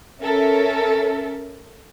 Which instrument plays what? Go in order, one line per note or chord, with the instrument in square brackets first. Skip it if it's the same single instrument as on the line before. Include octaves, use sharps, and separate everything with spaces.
[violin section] C#4 A4 A#4 E5